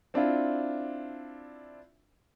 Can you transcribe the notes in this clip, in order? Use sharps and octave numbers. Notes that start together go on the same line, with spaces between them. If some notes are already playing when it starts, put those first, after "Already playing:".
C4 D4 E4 F4